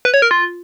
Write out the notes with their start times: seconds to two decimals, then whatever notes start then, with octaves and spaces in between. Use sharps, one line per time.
0.05 B4
0.14 C#5
0.22 A#4
0.31 F4